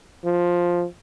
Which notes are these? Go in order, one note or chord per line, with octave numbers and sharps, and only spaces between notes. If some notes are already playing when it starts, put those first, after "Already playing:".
F3